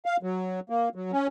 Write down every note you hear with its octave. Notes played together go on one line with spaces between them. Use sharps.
F5
F#3
A#3
F#3
C#4